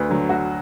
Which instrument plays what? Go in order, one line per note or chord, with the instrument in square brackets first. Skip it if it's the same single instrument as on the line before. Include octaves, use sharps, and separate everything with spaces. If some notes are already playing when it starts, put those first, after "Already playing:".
Already playing: [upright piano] D2 B4
D3 F#3
D2 F#4